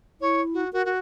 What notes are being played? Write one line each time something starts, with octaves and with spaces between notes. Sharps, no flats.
E4 C#5
F#4
F#4 A#4
F#4